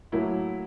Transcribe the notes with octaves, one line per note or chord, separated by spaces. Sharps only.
A2 F#3 A#3 E4